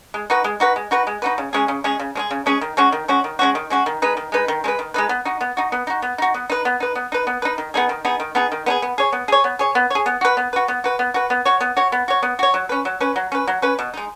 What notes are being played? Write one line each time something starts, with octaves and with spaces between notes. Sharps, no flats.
G#3
D#4 F#4 B4
G#3
D#4 F#4 B4
G#3
D#4 F#4 B4
G#3
D#4 F#4 B4
C#3
G#3 C#4 G#4
C#3
G#3 C#4 G#4
C#3
G#3 C#4 G#4
C#3
G#3 C#4 G#4
D#3
G#3 C#4 F#4
D#3
G#3 C#4 F#4
D#3
G#3 C#4 F#4
D#3
G#3 C#4 F#4
D#3
G#3 D#4 B4
D#3
G#3 D#4 B4
D#3
G#3 D#4 B4
D#3
G#3 D#4 B4
B3
D#4 F#4
B3
D#4 F#4
B3
D#4 F#4
B3
D#4 F#4
B3
D#4 B4
B3
D#4 B4
B3
D#4 B4
B3
D#4 B4
D#3
B3 D#4 G#4
D#3
B3 D#4 G#4
D#3
B3 D#4 G#4
D#3
B3 D#4 G#4
B3
G#4 C#5
B3
G#4 C#5
B3
G#4 C#5
B3
G#4 C#5
B3
F#4 B4
B3
F#4 B4
B3
F#4 B4
B3
F#4 B4
B3
F#4 C#5
B3
F#4 C#5
B3
F#4 C#5
B3
F#4 C#5
F#3
C#4 B4
F#3
C#4 B4
F#3
C#4 B4
F#3
C#4 B4
B2
G#3 D#4